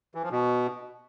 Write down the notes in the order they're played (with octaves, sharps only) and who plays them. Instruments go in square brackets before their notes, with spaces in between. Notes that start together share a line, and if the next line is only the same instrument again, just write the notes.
[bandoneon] E3
F3
B2